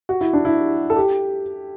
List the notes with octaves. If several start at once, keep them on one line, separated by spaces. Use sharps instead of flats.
F#4
E4
D4
E4
A4
G4